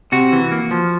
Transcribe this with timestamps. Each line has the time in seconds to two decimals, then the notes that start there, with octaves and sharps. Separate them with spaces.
0.12 C3 F#4
0.32 E3
0.52 A#3
0.71 F3